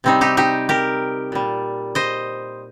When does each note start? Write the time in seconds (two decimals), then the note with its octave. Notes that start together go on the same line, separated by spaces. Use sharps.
0.04 C3 G3 C4 D#4
0.21 D#4 G4
0.37 D#4 G4
0.69 G4 A#4
1.32 A#2 G3
1.95 C5 D#5